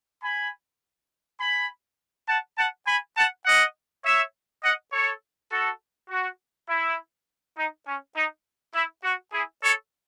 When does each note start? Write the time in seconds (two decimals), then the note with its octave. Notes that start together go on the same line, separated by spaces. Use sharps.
0.22 G#5 B5
1.40 G#5 B5
2.28 F#5 A5
2.57 F#5 A5
2.86 G#5 B5
3.16 F#5 A5
3.45 D#5 F#5
4.04 C#5 E5
4.63 D#5 F#5
4.92 A4 C#5
5.51 F#4 A4
6.09 F#4
6.69 E4
7.57 D#4
7.86 C#4
8.15 D#4
8.74 E4
9.04 F#4
9.32 E4 G#4
9.62 A4 C#5